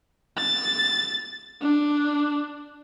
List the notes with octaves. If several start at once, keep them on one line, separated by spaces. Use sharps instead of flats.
A6
D4